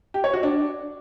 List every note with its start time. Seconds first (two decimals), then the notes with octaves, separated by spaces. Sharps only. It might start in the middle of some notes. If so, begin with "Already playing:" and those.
0.14 G4
0.24 C#5
0.33 F#4
0.43 D4